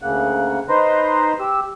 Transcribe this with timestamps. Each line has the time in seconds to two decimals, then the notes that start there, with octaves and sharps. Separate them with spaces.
0.02 D2 C#3 A#3 F#5
0.69 D#4 B4 C5 A#5 C6
1.40 G4 E6